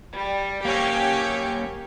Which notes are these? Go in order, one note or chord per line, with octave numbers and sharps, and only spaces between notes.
G3
A#3 C#4 G4 C#5